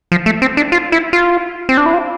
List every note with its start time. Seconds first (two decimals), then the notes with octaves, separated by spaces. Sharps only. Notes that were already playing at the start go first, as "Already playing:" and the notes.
0.12 F3
0.26 A3
0.42 C4
0.57 D4
0.72 F4
0.92 E4
1.13 F4
1.69 C4
1.77 D4
1.86 E4
1.93 F4